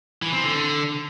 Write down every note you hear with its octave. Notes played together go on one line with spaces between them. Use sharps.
E3
C4
D3